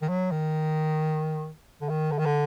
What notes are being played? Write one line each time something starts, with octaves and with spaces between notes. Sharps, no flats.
D#3
F#3
D#3
D3
D#3
D3
D#3
D3